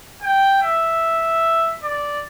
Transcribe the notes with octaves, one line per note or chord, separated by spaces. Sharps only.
G5
E5
D5